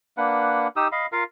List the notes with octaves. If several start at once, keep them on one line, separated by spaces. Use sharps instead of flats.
A#3 D4 B4 F#5
D#4 G4 D#6 E6
D#5 F5 B5
F4 A#4 F5